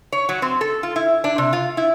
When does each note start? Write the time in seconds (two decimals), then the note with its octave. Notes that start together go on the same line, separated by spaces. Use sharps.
0.12 C#5
0.29 F#3
0.42 C4
0.61 A4
0.83 F4
0.96 E4
1.24 D4
1.38 C3
1.53 F4
1.77 E4